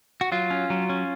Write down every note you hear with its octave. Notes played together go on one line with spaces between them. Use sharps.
F#4
F#3 F4
C#4
F#3
C#4